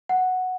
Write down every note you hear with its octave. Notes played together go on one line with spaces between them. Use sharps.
F#5